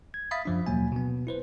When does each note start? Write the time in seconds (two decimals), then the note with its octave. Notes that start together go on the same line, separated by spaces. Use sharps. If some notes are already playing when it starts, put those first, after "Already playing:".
0.14 G#6
0.31 E5 F5 B5 D#6 A6 B6
0.45 F#2 F3 D4
0.66 D#2 B2 F#3 A#3 G#5
0.92 B2 B3
1.27 E4 B4 C5